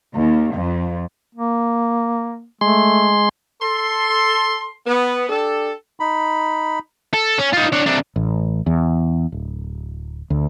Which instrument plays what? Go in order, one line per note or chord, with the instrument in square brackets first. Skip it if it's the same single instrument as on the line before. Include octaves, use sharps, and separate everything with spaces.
[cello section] D#2
F2
[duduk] A#3
[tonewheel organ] G#3 C6 [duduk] A3
[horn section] A4 C6
B3
D4 G4 A4
[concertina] D#4 B5
[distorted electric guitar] A4
C#4
D#4 F4
D4 C#5
C3 D4
[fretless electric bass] A1
E2
D1
D2